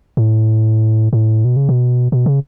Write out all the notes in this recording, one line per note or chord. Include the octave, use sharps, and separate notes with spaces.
A2
A2
B2
C#3
B2
B2
C#3